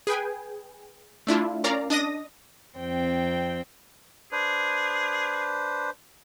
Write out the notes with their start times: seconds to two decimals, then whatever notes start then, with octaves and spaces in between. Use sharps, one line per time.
0.07 G#4 B4 G5 G#5
1.27 A3 D4 E4 F4
1.64 C#4 A#4 D5 F5 A#5
1.90 D4 D#5 D#6 A#6
2.78 F2 C4 G5
4.32 D4 G#4 B4 C5